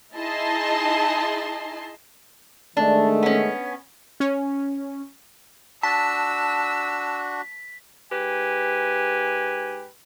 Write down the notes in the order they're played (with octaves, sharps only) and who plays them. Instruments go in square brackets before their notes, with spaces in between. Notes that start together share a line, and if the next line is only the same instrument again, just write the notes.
[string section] D#4 E4 G#4 D#5 A5 C6
[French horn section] D#3 G#3 A3 [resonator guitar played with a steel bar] D4
[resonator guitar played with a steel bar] B3 C#4
[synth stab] C#4
[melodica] D4 F#4 [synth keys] A5 [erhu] E6 [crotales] B6
[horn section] G#2 G4 B4 G#5